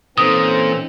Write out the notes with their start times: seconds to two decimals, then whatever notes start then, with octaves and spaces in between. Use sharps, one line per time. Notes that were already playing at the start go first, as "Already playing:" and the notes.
0.18 A#2 E3 C4 C#4 D#4 A4 C5 D#6